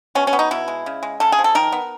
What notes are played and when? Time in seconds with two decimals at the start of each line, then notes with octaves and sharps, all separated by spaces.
0.15 B2 C#4
0.27 C#4
0.33 B3
0.39 D#4
0.51 B2 E4
0.68 G#3
0.86 C#3
1.03 G#3
1.20 C#3 A4
1.32 G#4
1.39 F3
1.44 A4
1.55 D#3 A#4
1.72 B3